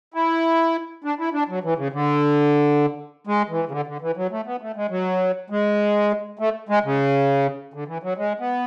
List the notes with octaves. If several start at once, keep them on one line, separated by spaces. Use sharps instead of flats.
E4
D4
E4
D4
F#3
E3
C#3
D3
G#3
E3
C#3
D3
D3
E3
F#3
A3
B3
A3
G#3
F#3
G#3
A3
G#3
C#3
D3
E3
F#3
G#3
B3